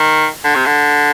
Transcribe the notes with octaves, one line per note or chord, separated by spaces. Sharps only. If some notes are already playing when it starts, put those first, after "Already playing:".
Already playing: D#3
D3
C3
D3